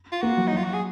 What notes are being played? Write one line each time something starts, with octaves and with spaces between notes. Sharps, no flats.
F4
A#3 F#4
F#3
D#4
F#3 F4
F#4
G#4